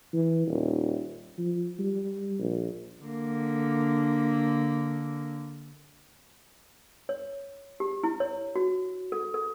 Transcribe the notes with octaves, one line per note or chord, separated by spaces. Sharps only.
E3
D#1
F3
G3
A#1
D3 A#3
C#5
G4
E4
C#5
F#4
A4
A4